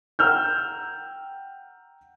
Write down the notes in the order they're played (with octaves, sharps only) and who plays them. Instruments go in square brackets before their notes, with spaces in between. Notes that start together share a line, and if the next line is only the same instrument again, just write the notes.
[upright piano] F#5 G5 A#5 E6 F6 G6